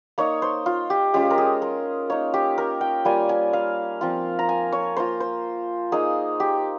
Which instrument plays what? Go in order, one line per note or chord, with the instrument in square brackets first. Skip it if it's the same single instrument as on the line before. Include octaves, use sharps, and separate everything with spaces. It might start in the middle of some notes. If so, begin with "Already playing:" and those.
[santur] A#3 D#4 C#5
C5
F4
G4
G#3 C#4 F4 G4
A#4
G#4
A#4
A#3 D#4 C#5
G4
A#4
G5
G3 A#3 F4 G#5
G#5
F5
F3 C4 F4
A#5
G#5
C#5
A#3 F4 C5
C5
A#3 D#4 G#4
G4